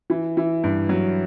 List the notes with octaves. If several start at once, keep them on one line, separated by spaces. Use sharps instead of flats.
E3
E3
G2
F#3